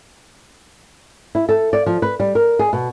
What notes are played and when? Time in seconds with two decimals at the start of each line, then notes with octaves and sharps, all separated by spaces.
1.35 E4
1.49 A4
1.73 D5
1.86 F3
2.02 B4
2.20 G3
2.35 A#4
2.59 G#4
2.73 B2